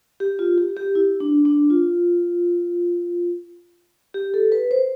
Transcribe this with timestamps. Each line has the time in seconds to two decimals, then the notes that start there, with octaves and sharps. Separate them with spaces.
0.20 G4
0.39 F4
0.58 G4
0.77 G4
0.95 E4
1.20 D4
1.45 D4
1.70 F4
4.14 G4
4.34 A4
4.52 B4
4.71 C5